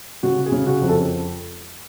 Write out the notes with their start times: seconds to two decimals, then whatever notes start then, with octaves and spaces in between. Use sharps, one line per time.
0.23 C#3 F#4
0.46 G#4
0.52 C#3
0.67 F#4
0.82 F2
0.89 A4